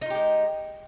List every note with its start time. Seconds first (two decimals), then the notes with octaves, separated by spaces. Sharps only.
0.01 D#4
0.06 F4
0.10 G4
0.15 G#3